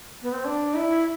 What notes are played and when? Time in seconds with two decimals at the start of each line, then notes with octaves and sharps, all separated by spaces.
0.22 B3
0.33 C4
0.45 D4
0.75 E4